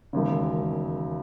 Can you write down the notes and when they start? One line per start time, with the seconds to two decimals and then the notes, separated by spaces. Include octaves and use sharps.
0.13 E1 D#2 C#3